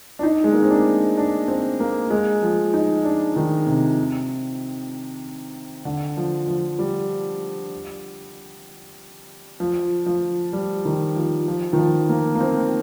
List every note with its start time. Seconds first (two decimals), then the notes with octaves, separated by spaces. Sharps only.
0.19 D4
0.23 D#4
0.44 G#3
0.53 A#3
0.63 C4
0.70 D4
1.18 D4
1.48 C4
1.80 A#3
2.11 G#3
2.42 F3
2.74 D#4
3.04 D4
3.36 D#3
3.67 C3
5.85 D3
6.17 F3
6.47 F3
6.79 G3
9.60 F3
10.06 F3
10.53 G3
10.85 D#3
11.16 F3
11.48 F3
11.73 D#3
11.78 F3
12.09 A#3
12.35 A#3
12.41 C4